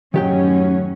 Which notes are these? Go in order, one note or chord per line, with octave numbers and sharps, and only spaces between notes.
F#2 A2 D#3 F#3 C#4 G4 G5